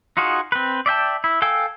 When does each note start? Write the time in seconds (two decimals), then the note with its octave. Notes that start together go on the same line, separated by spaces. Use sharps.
0.17 D#4 F4 F#4 G#4
0.52 C4 B4
0.86 D5 E5 G5 A5
1.24 E4
1.42 A4 F5 G5 G#5 E6